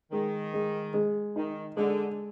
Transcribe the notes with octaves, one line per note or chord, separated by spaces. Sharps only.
D#3 G#3
G#3
G#3
D#3 D#4
D3 G#3